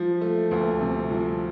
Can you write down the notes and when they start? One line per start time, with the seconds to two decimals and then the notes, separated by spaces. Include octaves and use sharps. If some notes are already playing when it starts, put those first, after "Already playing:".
Already playing: F3
0.21 A3
0.51 D2
0.81 C3
1.10 F3